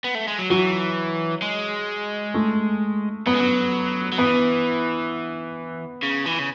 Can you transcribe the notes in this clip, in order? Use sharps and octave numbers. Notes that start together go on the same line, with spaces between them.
B3
A3
G#3
F#3
E3 F#3
G#3
A3
F#3 B3
G#3
F#3
F#3
E3 B3
C#3
E3
C#3